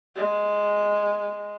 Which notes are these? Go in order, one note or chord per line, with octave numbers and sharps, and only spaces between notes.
G#3